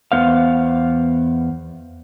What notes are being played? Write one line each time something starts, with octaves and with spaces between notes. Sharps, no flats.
E2 B3 C5 F5